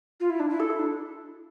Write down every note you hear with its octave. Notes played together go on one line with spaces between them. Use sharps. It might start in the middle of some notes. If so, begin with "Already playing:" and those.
F4
E4
D4
E4
A4
E4
D4